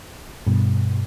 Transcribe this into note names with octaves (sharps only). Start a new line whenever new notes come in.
G2 B2